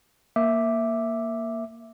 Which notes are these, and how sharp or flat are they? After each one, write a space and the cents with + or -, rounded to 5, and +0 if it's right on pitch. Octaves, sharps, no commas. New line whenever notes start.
A#3 +0 E5 +0 D6 +0